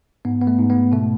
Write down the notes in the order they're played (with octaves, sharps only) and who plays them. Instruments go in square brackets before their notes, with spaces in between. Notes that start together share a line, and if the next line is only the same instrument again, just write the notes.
[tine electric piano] G#2 B3
B3
A3
G#2
B3
B2 A3